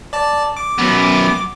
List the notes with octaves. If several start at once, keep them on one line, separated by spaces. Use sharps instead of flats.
D5 A5
D6
F#2 B3